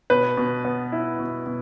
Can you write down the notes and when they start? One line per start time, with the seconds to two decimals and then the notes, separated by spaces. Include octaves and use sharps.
0.10 B2 B4
0.37 B2
0.65 B3
0.92 E4
1.19 B2
1.46 B2